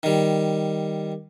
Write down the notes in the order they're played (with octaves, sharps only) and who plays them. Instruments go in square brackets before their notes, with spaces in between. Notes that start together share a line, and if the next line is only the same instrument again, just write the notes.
[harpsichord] D#3 G3